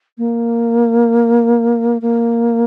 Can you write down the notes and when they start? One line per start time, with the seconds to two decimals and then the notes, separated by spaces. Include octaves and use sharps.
0.18 A#3
2.02 A#3